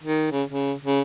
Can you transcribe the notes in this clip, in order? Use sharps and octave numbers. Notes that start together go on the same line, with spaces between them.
D#3
C#3
C#3
C#3